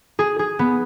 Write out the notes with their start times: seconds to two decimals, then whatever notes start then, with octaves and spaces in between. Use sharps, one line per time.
0.19 G#4
0.39 G#4
0.59 B3